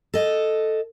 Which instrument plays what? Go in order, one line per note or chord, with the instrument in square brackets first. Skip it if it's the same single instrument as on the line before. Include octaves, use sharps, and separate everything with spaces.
[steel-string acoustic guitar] A4 D#5